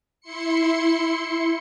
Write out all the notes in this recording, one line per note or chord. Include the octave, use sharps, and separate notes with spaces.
E4 C6 C#7